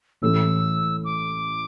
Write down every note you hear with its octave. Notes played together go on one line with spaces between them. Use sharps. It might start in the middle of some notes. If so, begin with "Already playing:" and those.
A1 A2 E3 A3 E6
D6